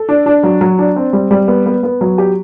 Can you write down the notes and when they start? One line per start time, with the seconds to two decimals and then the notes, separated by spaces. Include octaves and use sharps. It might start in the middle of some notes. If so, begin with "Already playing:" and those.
Already playing: A4
0.09 D4
0.26 D4
0.43 F#3
0.61 F#3
0.79 D4
0.96 C4
1.13 G3
1.31 G3
1.48 B3
1.66 B3
1.83 B3
2.01 F#3
2.18 G4